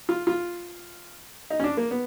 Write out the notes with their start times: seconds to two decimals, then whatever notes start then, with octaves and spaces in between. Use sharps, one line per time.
0.09 F4
0.27 F4
1.50 D#4
1.60 C#4
1.64 D4
1.77 A#3
1.91 B3